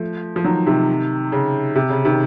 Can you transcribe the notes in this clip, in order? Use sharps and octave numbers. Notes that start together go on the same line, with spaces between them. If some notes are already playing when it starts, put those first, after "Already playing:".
Already playing: F3 A3
F3
D#3 F#3
C3 D#3
C#3
C3
C#3
C3 D#3